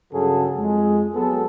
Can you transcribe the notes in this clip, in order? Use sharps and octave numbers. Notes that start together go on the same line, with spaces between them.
G2 C#3 F#3 F#4 G#4 A4
F2 G#3
F#3 B3 G#4 A4